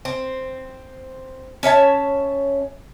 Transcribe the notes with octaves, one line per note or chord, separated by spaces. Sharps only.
C4
C#4 C#5 E5 A5